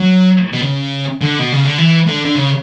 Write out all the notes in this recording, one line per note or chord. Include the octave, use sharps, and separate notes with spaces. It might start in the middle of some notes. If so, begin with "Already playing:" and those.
Already playing: F#3
B2
C#3
D3
B2
C#3
D3
E3
D3
D3
C#3